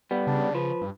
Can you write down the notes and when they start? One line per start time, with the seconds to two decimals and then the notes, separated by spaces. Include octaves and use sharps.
0.11 G3 B3
0.27 C#3 D4
0.55 F3 B4
0.81 G2